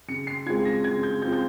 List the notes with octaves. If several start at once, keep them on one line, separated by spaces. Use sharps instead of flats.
C#3 C#7
C7
G#3 C4 F4 G#6
A#6
C#3 G#6
G6
G#3 C4 F4 G6
G6